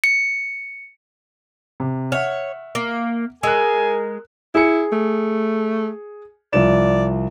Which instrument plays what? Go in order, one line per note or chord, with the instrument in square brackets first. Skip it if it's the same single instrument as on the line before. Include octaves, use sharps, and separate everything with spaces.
[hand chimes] C#7
[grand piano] C3
[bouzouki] C#5 [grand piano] E5 F#5 F6
[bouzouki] A#3
[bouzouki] G#3 [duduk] A#4 [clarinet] G#5 [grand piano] E6 F#6
[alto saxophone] E4 [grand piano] G#4 C#7
[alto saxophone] A3
[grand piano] C2 F3 E7 [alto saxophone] D5